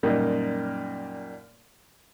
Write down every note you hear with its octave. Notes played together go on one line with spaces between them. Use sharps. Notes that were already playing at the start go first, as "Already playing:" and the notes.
F#2 A#2 G3 A#3 D#4